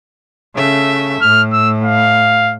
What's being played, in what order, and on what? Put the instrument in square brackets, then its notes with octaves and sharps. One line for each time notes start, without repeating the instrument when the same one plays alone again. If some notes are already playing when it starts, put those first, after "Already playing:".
[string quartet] C#3 A3 E5
[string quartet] A2 [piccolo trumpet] F6
[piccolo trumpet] E6
F5